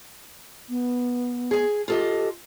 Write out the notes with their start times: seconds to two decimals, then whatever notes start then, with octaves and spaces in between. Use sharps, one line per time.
0.70 B3
1.51 G#4 G#5
1.88 F4 G4 A4 D#5